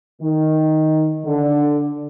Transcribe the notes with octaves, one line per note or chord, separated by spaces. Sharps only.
D#3
D3